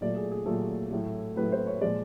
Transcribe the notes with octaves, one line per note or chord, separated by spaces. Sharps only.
A#2 F#3 A3 D5
G#4
G#4
A#2 F#3 A3 A4
A2 F#3 A3
A2 F#3 A3 B4
C5
C#5
A#2 F3 G#3 D5